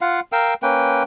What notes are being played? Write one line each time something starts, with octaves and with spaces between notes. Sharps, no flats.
F4 F5 F#5
A#4 F5 G5 E6
A#3 C#4 B4 G5